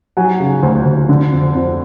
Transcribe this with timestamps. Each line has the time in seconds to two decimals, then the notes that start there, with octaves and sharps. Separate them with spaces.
0.17 F#3 F#5 G#5
0.40 C#3
0.63 D2
0.85 D2
1.09 D3
1.32 F2
1.55 F2